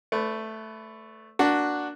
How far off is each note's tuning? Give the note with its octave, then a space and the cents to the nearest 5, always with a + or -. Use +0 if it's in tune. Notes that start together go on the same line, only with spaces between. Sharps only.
A3 +0 B4 +20 D5 -30
A#3 +0 D4 +0 F#4 +0